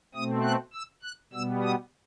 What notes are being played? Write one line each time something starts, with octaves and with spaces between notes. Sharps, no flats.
B2 A3 C4 D#6
F#6
E6
F#6
B2 G3 B3 E6
D#6